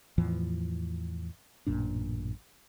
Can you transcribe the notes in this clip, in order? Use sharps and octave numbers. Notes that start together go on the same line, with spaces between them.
E2 A2 E3 F3
A1 F#2 A#2 D4